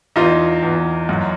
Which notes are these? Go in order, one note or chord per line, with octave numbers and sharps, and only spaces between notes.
E2 D#4 F4
E2
F#2